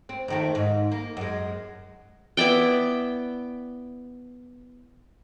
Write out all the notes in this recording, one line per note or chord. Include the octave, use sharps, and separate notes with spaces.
C4
F2 D#3 A3
G#2
A#3
F#2 G#3
B3 E4 D5 G5